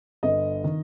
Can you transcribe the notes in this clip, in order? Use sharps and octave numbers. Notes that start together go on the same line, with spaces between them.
G1 D#5
D#3